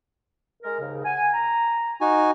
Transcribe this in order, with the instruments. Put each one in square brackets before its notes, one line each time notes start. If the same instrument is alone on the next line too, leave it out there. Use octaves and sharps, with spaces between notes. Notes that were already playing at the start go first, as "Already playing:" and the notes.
[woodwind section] G#3 A#4
D#2 G#2 C#3
F#5 G#5
A#5
[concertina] D#4 F#4 G#5